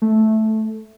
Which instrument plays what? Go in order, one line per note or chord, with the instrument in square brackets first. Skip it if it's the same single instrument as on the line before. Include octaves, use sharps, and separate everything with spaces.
[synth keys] A3